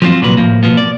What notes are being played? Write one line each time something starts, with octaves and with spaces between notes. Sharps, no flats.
F3 F#3 B3 C4 F4
C2 A#2 F#3 B4
A2 F3 A#3
B2 F3 A#3 B3
D5